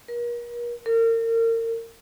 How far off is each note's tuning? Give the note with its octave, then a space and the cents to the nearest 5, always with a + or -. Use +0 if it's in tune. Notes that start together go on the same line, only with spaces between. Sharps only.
A#4 +40
A#4 -35